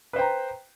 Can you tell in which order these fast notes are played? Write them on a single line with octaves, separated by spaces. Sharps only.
B4 C5 G5 A#5